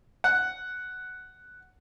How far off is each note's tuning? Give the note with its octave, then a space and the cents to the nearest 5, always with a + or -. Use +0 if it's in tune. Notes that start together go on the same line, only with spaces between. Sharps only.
F#5 +5